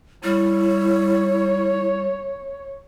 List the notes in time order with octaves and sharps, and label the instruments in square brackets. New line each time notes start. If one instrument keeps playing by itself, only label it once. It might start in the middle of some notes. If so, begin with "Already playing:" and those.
[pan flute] G3 [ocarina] E4 [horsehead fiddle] C#5